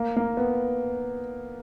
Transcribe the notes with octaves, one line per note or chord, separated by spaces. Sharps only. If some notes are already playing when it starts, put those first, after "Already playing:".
Already playing: A#3
A#3
B3